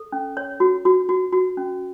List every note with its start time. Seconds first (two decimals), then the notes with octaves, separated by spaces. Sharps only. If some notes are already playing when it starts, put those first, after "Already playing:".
Already playing: A4
0.12 C#4
0.37 C#5
0.60 F#4
0.85 F#4
1.09 F#4
1.33 F#4
1.57 C#4